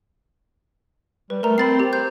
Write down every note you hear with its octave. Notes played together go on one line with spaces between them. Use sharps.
G3 B4
A3 A#4 A#5
C4 B5 A6 C7
G4
C5 G6